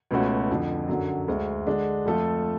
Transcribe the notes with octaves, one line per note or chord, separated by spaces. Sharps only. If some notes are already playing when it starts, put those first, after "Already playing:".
C#2 B2 A3 C#4 F#4
F2 D3 F3
F#2 D3 F#3
D2 D3 G#3
D3 G#3 D4
F2 F3 A3 F4 A4